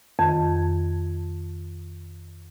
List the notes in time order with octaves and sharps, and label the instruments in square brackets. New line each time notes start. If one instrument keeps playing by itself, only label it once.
[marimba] F2 D#3